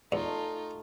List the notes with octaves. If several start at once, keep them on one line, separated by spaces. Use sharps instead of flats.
E2 A3 D#4 F4